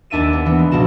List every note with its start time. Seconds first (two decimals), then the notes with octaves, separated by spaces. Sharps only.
0.10 D#2 D4 E5 D#7 E7
0.33 B3
0.46 E3 B3
0.59 G#3
0.71 C#2 B2 F3 F#4 E7